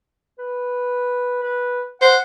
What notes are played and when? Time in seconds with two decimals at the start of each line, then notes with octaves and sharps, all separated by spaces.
0.39 B4
1.43 B4
2.01 C5 F#5